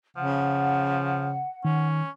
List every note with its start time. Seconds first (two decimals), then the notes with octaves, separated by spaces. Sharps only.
0.17 C#3 F3 F#5
1.65 D#3 C#4